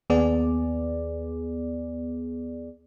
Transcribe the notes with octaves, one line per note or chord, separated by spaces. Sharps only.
D#2 B3 G#4 D5